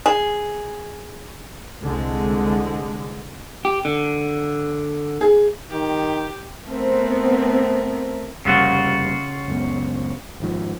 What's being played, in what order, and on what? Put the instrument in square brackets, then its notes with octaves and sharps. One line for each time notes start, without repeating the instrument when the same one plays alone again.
[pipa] G#4
[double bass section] C2 D3 G#3
[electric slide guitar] G4
D3
[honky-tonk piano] G#4
[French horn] D#3 [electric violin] G4
[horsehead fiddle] A3 A#4 [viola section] B3 C4
[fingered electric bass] F1 G3 A#3 [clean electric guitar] C#3 F4 F#4
[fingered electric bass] F#1 C#2 B3
G#1 G#2 F3